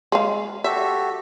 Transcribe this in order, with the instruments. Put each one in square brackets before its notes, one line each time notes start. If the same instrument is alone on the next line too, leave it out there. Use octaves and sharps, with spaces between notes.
[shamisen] G#3 F5
[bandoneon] F#4 G4 A4 [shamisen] E5